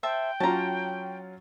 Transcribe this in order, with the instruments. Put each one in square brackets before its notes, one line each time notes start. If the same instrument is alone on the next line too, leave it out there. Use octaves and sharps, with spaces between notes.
[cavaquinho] C5 E5 A5 [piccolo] G5
[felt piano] F#3 C#4 F4 [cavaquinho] A5 A#5